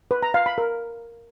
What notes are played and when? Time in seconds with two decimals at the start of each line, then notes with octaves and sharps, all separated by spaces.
0.11 B4
0.23 A#5
0.34 F5
0.46 B5
0.58 A#4